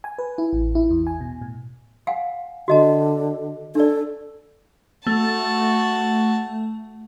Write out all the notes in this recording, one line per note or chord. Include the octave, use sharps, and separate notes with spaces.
G#5
B4
E4
A1
E4
E2
G#5
B2
A2
F5 F#5 G#5
D3 F#4 D#5 A5
D4 A4 D5
A3 F#4 A5